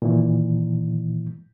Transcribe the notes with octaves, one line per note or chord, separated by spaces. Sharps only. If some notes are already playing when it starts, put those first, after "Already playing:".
A#2 D#3 E3